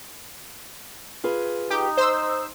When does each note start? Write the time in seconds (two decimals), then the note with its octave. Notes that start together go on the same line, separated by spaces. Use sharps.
1.24 F4 G#4 B4
1.70 D#4 G4
1.97 C5 D#5 E6